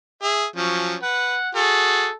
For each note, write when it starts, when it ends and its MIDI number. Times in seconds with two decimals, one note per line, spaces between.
0.23 0.45 68
0.23 0.45 76
0.56 0.95 53
0.56 0.95 54
0.56 0.95 61
1.02 1.35 71
1.02 1.50 78
1.55 2.07 66
1.55 2.07 68
1.55 2.15 69